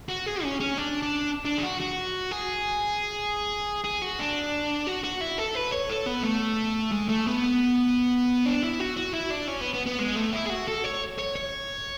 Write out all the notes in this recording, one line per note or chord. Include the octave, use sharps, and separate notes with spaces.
F#4
G#4
C#4
C#4
D4
D4
D4
G#4
F#4
F#4
G#4
G#4
F#4
D4
F#4
F#4
E4
A4
B4
C#5
A4
B3
A3
G#3
A3
B3
D4
E4
F#4
F#4
E4
D4
C#4
B3
B3
B3
G#3
A3
E4
G#4
F#4
A4
C#5
C#5
C#5